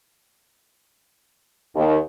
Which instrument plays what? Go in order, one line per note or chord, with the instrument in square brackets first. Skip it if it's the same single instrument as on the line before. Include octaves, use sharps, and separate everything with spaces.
[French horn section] D#2